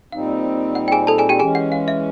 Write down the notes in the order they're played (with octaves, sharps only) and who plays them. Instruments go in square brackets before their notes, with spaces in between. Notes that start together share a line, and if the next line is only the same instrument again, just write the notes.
[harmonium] A#2 G3 C4 D#4 [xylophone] F5
[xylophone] F#5
G5
G#4 G#5
A4 A5
G#4 G#5
G4 G5
[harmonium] E3 G#3 C#4 [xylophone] G#4 G#5
[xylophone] F#5
F5
E5